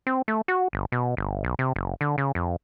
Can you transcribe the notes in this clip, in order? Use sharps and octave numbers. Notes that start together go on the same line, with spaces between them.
C4
A3
F#4
G1
B2
G1
B1
C3
F#1
D3
C#3
F2